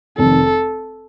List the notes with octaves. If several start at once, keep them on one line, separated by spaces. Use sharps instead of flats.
F1 F2 D#3 A4